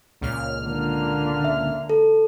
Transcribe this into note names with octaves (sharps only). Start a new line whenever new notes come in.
C#2 A#2 F6
D3 A#3
E5
A4